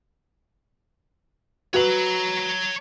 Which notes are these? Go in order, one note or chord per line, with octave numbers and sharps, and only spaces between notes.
F#4 B4 C#5 A#5 F#7